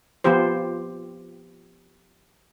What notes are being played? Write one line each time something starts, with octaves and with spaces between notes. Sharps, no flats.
F3 B3 F4 G4 C5